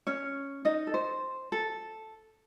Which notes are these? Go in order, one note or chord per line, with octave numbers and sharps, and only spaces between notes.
C#4 C#5
D#4 D#5
A4
C5
A4